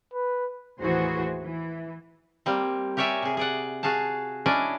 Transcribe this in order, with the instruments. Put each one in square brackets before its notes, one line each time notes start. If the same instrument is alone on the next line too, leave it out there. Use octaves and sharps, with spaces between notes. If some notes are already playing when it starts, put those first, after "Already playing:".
[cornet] B4
[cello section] D#2 A2 E3 F#4 G#4 C5
E3
[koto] G3 A#3 C4
G4 A#4 C#5 D5 E5 G#5
C3 G#4
G#4 D5 F#5
F#4 G#4 F5 A5
C#4 D4 E4 D5 D#5 G#5